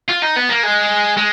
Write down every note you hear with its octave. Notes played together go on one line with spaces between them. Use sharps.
F4
D#4
B3
A#3
G#3
G#3